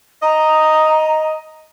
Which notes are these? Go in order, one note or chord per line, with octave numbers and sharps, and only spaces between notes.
D#5 A#5